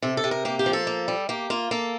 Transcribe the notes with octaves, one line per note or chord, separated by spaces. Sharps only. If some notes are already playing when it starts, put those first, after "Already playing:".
C3 A4
A4
C3
A#4
A#3 G4
G4
F3
A4
A#3
G3
A#3 G4
A#3 F4
A#3 A4